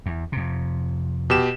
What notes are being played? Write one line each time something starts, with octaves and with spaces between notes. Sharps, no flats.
E2
F2 C3
B2 G4 E7